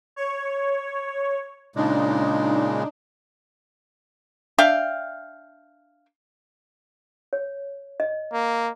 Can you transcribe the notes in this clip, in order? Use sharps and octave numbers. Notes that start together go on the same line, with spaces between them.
C#5
A#2 C#3 G#3 D4 D#4
D4 E5 F5 G5
C#5
D#5
A#3